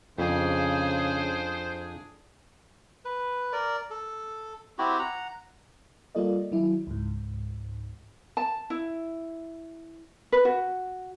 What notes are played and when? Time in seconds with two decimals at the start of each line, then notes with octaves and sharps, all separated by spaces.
0.18 F2 C#3 D4 G#4 C5
3.05 B4
3.53 A#4 D5
3.91 A4
4.78 C4 E4 F#4 G4
4.99 F#5 A#5
6.15 G3 A#3 F4 A4 D5 D#5
6.51 D#3 F#3 E4
6.87 C#2 G#2
8.37 A5
8.70 E4
10.32 B4
10.45 F#4